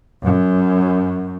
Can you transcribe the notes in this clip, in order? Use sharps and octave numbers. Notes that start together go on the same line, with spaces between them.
F#2